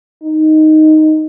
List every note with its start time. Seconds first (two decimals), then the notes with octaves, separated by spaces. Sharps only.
0.23 D#4